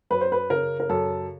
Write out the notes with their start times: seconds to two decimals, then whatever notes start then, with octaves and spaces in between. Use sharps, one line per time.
0.10 F#2 B4
0.21 C5
0.32 B4
0.50 C#3 A#4
0.80 A#4
0.89 F#2 A4